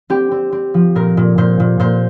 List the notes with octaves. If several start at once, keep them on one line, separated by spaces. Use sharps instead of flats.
C4 G4
C4
C4
F3
A#2 A#4
A#2
A#2 C5
A#2
A#2 C5